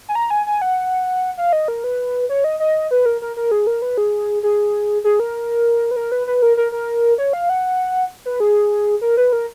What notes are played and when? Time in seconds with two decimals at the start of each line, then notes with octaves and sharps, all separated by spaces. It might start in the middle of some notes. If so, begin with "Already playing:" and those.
0.09 G#5
0.15 A#5
0.30 G#5
0.47 G#5
0.62 F#5
1.38 F5
1.53 D#5
1.68 A#4
1.84 B4
2.29 C#5
2.44 D#5
2.60 D#5
2.91 B4
3.06 A#4
3.22 A#4
3.37 A#4
3.51 G#4
3.67 A#4
3.82 B4
3.98 G#4
4.43 G#4
5.04 G#4
5.20 A#4
5.91 B4
5.96 A#4
6.12 B4
6.27 B4
6.42 A#4
6.57 A#4
6.72 A#4
7.18 C#5
7.33 F5
7.50 F#5
8.26 B4
8.40 G#4
9.01 A#4
9.17 B4
9.33 A#4